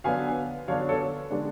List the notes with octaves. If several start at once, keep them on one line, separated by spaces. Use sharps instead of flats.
D3 F#3 B3 D4 F5 G#5
D3 F#3 B3 D4 C#5 F5
A4 C#5
D3 G#3 B3 D4